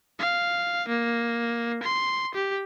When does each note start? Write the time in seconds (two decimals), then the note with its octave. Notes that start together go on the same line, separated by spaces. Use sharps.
0.19 F5
0.89 A#3
1.83 C6
2.35 G4